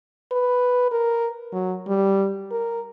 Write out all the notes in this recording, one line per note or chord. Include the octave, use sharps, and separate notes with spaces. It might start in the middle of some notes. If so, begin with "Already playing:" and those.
B4
A#4
F#3
G3
A#4